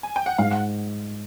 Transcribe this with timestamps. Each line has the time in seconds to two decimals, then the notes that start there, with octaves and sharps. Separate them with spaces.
0.03 G#5
0.16 G5
0.26 F#5
0.38 G#2 F5
0.51 F#5